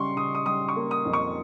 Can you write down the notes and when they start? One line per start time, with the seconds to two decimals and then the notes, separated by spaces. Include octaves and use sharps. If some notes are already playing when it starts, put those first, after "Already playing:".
Already playing: C#3 G3 C6 C#6
0.16 C#3 D#6
0.35 D#6
0.46 G3 D#6
0.69 C#6
0.76 A#3
0.91 D#6
1.05 F2
1.13 C#6